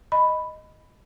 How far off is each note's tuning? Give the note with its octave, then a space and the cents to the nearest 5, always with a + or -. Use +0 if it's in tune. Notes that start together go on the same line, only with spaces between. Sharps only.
D#5 +0 B5 +5